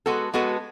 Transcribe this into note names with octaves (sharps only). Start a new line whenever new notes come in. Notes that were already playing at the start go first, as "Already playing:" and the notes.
G#3 B3 F#4 A4
G#3 B3 F#4 A4